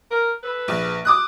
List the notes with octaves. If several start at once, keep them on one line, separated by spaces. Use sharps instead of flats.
A#4
A4 B4
A#1
D6 D#6 F#6